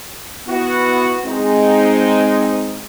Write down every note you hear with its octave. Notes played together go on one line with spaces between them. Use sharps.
B3 E4 F#4
G#3 C4 D#4